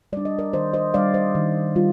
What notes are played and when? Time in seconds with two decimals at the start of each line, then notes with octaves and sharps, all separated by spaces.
0.13 G3 D4 D5
0.25 D#5
0.39 A#4 D5
0.53 D#3 C5 D#5
0.74 C5 D#5
0.94 G3 D4 D5 F5
1.14 C5 D#5
1.35 D#3
1.75 G3 F4